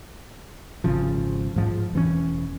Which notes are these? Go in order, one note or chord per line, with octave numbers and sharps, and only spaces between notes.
G#1 C#3 F3
G#2 F3
E1 E3 C#4